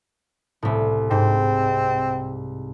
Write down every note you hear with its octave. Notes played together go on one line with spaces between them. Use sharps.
C2 A2
G#2 C4